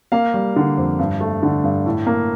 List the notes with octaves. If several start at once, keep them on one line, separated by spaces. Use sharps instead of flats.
A#3 F5
G3
D3
F2
G2
A3
D3
G2
A2
A#3